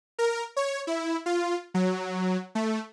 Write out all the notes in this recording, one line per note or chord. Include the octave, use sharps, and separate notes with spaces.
A#4
C#5
E4
F4
F#3
A3